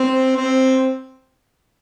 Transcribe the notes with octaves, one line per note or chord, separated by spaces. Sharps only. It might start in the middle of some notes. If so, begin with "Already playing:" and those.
Already playing: C4
C4